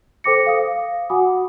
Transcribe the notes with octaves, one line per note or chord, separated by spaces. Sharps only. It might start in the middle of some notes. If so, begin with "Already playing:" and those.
A4 C5 G5 D6 A#6 C#7
F5 D#6
F#4 F#5 G#5 B5 D6 D#6